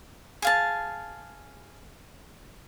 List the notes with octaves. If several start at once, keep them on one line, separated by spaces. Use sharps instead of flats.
G#4 F5 A5